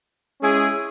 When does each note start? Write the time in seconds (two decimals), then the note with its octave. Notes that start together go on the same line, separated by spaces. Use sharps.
0.42 G#3 C#4 E4 G#4